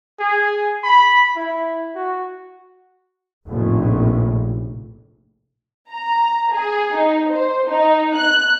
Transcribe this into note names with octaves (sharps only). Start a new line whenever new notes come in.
G#4
B5
E4
F#4
F1 A#1 A2
A#5
G#4
D#4
C5
D#4
F#6